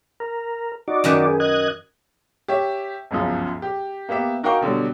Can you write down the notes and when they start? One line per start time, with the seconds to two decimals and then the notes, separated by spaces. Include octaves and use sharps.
0.20 A#4
0.88 D#4 F#4 D5
1.04 F#2 D#3 B4
1.26 G#4
1.40 D#5 F#6 G#6
2.48 G4 C#5 E5
3.11 G1 C#2 F#2 F3
3.62 G4
4.09 A#3 B3 G4 E5
4.43 D#4 F#4 A#4 F5 G5 C#6
4.61 B2 D3 F#3 G3